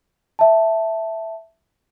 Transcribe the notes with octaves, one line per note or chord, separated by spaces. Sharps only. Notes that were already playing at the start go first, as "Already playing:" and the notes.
E5 A5